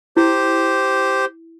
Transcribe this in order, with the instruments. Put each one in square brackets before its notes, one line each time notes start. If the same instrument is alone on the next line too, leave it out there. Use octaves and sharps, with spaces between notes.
[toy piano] E4 [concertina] G4 C5